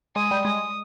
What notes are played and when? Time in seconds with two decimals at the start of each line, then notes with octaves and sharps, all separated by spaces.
0.16 G#3 D#6
0.31 G3
0.45 G#3 D#6